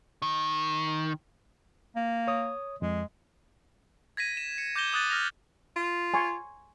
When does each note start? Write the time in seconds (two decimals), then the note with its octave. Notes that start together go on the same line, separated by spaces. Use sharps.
0.22 D#3
1.96 A#3
2.27 C#5 D#6
2.82 F2 G#3
4.17 G#6 A#6 B6 D#7
4.37 E7
4.58 C#7
4.76 D6 G6 G#6 A#6 E7 G7
4.93 D6 D#6 F#6 A6 D#7
5.10 F6 A#6 F7
5.76 F4
6.14 G#5 C6 C#6